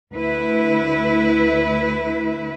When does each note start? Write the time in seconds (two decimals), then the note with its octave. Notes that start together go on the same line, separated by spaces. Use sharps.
0.13 D2 E4 B4